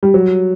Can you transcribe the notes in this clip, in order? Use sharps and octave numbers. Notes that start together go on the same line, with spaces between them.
G3
F#3